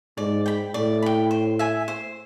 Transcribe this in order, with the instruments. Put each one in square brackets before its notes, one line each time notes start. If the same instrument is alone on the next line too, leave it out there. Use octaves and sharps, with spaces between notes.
[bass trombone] G#2 [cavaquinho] D5
[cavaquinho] G5 B5
[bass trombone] A2 [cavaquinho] D5
[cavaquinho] G5 B5
C5
E5 G#5
C5